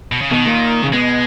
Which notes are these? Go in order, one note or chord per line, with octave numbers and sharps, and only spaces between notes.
B2
C#3
B2 D#3
A#2
C#3
B2 G#3